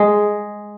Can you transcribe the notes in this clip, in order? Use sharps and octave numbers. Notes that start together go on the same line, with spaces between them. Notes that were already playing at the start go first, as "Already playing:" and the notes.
Already playing: G#3